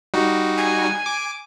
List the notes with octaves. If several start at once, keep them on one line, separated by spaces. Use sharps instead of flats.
G3 D#4 F#4
G#5
D6